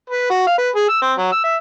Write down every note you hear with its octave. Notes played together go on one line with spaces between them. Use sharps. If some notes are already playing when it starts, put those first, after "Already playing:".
B4
F#4
F5
B4
G#4
E6
C4
F#3
E6
E5